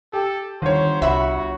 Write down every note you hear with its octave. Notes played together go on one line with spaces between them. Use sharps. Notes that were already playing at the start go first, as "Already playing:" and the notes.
G4 A4
G1 D#3 C5 C#5
C2 F#4 E5 B5